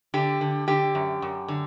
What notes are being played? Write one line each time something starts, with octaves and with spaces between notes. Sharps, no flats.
D3 G4
D3
D3 G4
F#2
F#2
D3